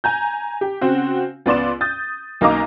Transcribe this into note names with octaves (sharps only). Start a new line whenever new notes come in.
G#5 A#5 G6
G4
C#3 C4 F#4
C#2 B3 D5 C6 E7
D#6 G6 A6
B1 A#3 D#4 D#5 A#5 D6